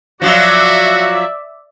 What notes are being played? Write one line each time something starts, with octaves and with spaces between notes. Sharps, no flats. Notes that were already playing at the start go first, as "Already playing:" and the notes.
F3 F#3 F4 F#4 D5 E5